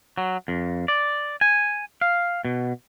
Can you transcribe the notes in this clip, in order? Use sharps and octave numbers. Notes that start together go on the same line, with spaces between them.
F#3
F2
D5
G#5
F5
B2